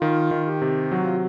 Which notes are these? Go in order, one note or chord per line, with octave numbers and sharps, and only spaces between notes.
D#3 F4
D#3
G4
C3
F#3 F#4
F4